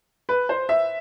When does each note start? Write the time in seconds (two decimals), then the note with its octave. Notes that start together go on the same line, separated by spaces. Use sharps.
0.29 B4
0.49 C5
0.69 E5